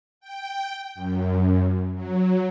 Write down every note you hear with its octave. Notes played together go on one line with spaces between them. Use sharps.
G5
F#2
F#3